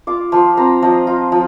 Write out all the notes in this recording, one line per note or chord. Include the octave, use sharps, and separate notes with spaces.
F4 D6
F3 C6
C4 A#5
F3 D#5
F4
F3